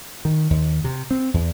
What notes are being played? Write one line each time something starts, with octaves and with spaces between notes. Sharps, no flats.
D#3
D#2
C3
C4
E2